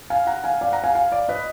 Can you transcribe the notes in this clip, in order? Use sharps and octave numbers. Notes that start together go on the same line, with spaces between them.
F5 G#5
F#5 A#5
F5 G#5
D5 F5
F#5 A#5
F5 G#5
F5 G#5
D5 F5
B4 D#5